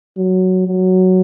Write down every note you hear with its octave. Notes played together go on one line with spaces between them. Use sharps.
F#3
F#3